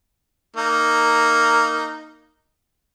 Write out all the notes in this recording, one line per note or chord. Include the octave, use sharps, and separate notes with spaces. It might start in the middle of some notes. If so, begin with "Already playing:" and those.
A#3 D#4